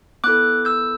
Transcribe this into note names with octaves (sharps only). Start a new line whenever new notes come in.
B3 E4 A4 D6 F#6
E6 G6